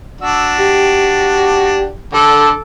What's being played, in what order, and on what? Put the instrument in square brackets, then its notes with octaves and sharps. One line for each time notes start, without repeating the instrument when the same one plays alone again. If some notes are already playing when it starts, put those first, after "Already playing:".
[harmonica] D4 F#4 [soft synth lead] E6
[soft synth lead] G4
[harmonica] D3 [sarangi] A4 [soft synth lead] D6